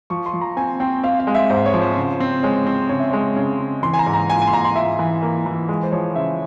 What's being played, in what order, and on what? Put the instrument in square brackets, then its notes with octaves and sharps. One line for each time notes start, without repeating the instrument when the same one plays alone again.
[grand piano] F3 [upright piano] C#6
[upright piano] C6
[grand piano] F3
[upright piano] A#5
[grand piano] C4 [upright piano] G#5
[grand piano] C4 [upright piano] G5
[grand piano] C4 [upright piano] F5
[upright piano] F5
[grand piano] G#3
[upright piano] E5
[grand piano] G#2 [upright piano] C5
[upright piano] C#5
[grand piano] F3
[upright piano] C5
[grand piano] C#3
C4
[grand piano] G#3 [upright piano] C#5
[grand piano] C4
[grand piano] C#3 [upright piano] C#5
[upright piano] E5
[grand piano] G#3 [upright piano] C#5
[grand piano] C#3
C#3
[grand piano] E3 [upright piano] C6
[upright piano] G#5
A#5
[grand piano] G#2
[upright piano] A#5
[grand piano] F4 [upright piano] G#5
[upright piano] G#5
C6
[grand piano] G#2 [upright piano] A#5
[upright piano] C6
[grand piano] F4 [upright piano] E5
[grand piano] E3
A#3
E3
G#3
[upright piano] C5
[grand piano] F3 [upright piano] C#5
[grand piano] C#3 [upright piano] E5